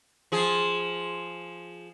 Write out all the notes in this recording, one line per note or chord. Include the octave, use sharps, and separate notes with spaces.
F3 G#4